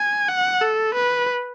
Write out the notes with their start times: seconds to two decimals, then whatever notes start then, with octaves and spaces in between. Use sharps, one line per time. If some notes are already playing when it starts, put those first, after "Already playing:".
Already playing: G#5
0.28 F#5
0.61 A4
0.95 B4